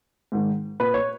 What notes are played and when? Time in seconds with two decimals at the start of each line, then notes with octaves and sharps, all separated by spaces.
0.32 G#2 D#3
0.80 A#2 B4
0.94 C#5